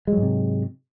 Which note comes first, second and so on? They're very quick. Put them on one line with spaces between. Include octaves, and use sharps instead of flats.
G#3 F#3 G#2 C3